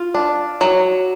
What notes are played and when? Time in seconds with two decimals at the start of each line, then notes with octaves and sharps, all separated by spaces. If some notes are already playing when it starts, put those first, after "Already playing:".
Already playing: F4
0.15 D4
0.61 F#3